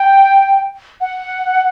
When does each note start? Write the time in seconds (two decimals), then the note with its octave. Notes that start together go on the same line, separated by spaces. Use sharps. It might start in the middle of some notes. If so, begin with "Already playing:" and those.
Already playing: G5
1.01 F#5